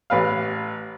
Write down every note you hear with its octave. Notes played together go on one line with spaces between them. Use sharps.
A1 B4 F5